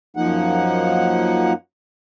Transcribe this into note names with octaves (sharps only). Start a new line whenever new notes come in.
F#2 F3 A#3 D#4 F#5